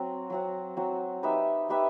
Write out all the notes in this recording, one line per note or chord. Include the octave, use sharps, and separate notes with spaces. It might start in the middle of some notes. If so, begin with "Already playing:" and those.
Already playing: F#3 C4 F#4
F#3 C4 F#4
F#3 C4 F#4
D#4 G4 B4 E5
D#4 G4 B4 E5